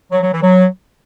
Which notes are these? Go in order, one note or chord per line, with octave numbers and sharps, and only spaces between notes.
F#3
F#3
E3
F#3